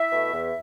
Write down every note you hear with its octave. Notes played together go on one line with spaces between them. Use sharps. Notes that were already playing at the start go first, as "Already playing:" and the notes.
Already playing: E4 E5
B2 A3
E2